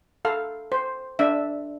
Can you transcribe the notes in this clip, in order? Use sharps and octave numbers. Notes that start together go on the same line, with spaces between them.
A4 F5
C5
D4 E5